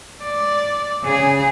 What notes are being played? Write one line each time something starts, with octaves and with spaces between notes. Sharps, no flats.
D5
C#3 G#4